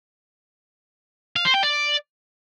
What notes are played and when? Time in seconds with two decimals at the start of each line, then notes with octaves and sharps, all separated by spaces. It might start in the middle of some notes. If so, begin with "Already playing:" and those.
1.36 F5
1.45 C5
1.54 G5
1.63 D5